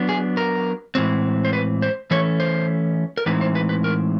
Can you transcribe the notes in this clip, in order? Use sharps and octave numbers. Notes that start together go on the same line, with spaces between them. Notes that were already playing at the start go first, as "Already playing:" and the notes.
Already playing: F#3 B3 D4
G#4
A#4
A2 E3 G#3 C4
C5
B4
C5
E3 A3 C#4 C#5
C5
A#4
A2 E3 G#3 C4 D#4 B4
C5
B4
B4
A#4